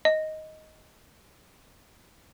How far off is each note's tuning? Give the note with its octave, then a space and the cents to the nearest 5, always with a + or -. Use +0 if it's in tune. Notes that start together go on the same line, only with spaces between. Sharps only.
D#5 +5